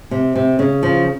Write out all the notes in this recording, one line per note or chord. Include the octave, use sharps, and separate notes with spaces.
C3
C3
C#3
F3